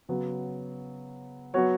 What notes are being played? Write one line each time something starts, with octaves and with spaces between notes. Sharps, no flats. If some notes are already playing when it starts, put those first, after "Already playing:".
C#3 F#3 B3
F#3 B3 F#4 C#5